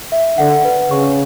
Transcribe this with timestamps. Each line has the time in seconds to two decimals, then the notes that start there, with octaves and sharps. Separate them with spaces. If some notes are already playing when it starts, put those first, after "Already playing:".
0.12 E5
0.38 D3 F#5
0.65 B4
0.90 C#3 C#6